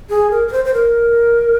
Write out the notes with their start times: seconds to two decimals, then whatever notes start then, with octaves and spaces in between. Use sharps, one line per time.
0.10 G#4
0.31 A#4
0.48 A#4
0.52 C5
0.65 C5
0.74 A#4